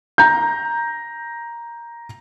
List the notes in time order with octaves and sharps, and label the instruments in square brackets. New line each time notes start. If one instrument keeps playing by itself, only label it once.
[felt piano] A#5 G6